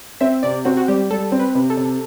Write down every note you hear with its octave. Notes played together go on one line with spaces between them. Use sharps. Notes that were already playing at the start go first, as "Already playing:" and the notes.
C4 E5
C3 D5
C4 F#4
F#4
G3 G4
G3 A4
C4
B4
C3
A4
C3